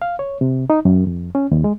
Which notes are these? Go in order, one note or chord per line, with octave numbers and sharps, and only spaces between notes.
F5
C#5
C3
D#4
F#2
F2
C#4
D#2
G#3